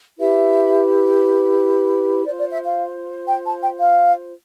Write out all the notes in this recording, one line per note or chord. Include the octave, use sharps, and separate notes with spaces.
E4 G4 B4 E5
F4 C5 D5
D5
E5
F5
G5
A5
G5
F5